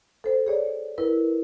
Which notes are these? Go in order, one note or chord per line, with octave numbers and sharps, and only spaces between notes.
A4 C5
G#4 C#5 D5
E4 A#4 B4